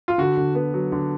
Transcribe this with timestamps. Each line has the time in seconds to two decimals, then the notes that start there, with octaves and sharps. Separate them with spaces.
0.08 F4
0.18 D3 F#4
0.37 D3
0.55 B3
0.74 F#3
0.92 D3